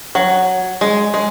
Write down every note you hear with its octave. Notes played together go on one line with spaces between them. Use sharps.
F#3
G#3
G#3